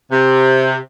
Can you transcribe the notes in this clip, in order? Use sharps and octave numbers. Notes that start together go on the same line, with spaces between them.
C3